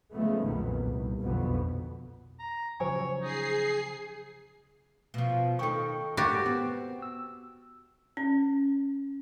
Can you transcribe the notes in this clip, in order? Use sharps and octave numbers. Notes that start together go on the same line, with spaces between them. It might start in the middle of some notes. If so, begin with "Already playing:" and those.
C#3 F3 G#3 A3 B3
B1 F2 A#2 D#3 B3
C2
B1 F2 B2 D3 B3
A#5
C#3 F3 F#3 C5 C#5 G#5
D#4 G#4 C7
B2 F3
D#3 D#4 A4 G5 C#6
G#2 F#4 G4 A#4 D6 A6
B3 C4
E6
C#4